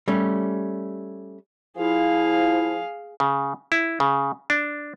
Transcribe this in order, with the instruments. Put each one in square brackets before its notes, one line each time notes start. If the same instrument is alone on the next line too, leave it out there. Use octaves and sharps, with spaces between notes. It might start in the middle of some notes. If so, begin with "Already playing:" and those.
[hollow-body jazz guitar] G3 A3 C#4
[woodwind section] F3 E4 [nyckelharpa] G#4 F5
[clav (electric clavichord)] C#3
E4
C#3
D4